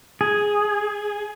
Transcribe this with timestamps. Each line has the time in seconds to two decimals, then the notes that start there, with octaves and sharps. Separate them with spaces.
0.21 G#4